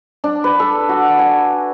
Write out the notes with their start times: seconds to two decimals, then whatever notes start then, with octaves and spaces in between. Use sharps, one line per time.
0.24 D4
0.44 B4
0.60 A4
0.89 F#4
1.19 G#5